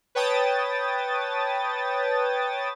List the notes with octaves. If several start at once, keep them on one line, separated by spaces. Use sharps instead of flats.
B4 C#5 G5 A5 D#6 A6